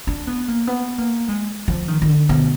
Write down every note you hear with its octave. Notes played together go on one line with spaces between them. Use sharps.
D4
B3
A#3
B3
A#3
G#3
F3
D#3
D#3
D3
B2